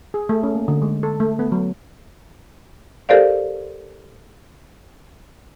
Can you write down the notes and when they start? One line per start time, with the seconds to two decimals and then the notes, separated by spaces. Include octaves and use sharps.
0.14 G#4
0.29 A3
0.43 C#4
0.55 A#3
0.68 D3
0.82 G#3
1.03 A4
1.20 A3
1.39 B3
1.52 F#3
3.09 G4 A4 A#4 C5 D5 F5